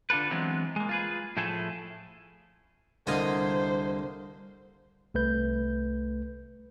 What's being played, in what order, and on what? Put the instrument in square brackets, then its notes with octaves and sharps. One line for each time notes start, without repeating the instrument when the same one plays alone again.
[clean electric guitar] D3 D4 F4 A4 B4
E3 F#3 G#3 B3 C4 D4
G#3 A#3
F4 G#4 B4
A2 F3 A3 E4 G#4 A4
[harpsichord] C2 A#3 G#5 [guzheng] D3 D#5 [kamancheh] C5
[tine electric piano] C2 A3 B4 G6